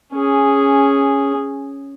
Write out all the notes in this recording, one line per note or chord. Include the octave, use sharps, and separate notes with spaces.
C#4 G#4